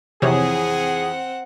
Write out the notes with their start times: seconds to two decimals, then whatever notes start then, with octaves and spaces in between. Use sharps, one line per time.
0.22 F2 C3 E3 C4 G#4 C#5 F#5